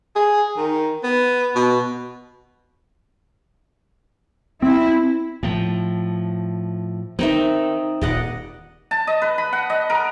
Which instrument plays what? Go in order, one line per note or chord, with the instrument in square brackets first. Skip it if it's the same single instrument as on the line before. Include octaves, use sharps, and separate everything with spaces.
[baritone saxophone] G#4
D#3
B3
B2
[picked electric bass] C4 [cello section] E4
[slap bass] A2 F3
[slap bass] D#3 [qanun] C4 D#4 E5
[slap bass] D#1 [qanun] D5 D#5 F#5
[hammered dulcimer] A5
D#5
B4
B5
F#5
D#5
A#4